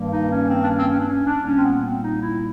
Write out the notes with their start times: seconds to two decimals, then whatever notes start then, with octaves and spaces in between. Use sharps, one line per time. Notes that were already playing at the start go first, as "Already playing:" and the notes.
Already playing: G2 D#3 G3 A#3
0.11 D#4
0.31 C#4
0.49 C4
0.64 D4
0.69 C#4
0.79 C4
0.88 C#4
0.98 D4
1.07 C#4
1.26 D4
1.45 A#2 G3 A#3 C#4
1.56 C4
1.64 B3
1.83 C4
2.02 D#4
2.22 E4